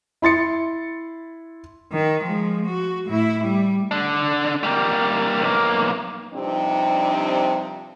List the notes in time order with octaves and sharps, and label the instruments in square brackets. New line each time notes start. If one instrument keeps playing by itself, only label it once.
[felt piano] E4 C6 A6 C#7
[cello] D#3
F3 G#3
F#4
A2 E4
G3
[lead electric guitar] D3 D4
G3 A#3
B1 A#3
[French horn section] G2 C3 F3 C4 D4 D#4